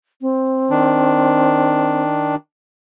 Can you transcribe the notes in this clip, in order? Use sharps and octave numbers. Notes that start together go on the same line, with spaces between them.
C4
D#3 D4